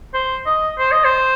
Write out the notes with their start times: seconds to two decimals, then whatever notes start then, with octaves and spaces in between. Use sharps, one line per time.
0.14 C5
0.46 D#5
0.78 C5
0.92 D#5
1.04 C5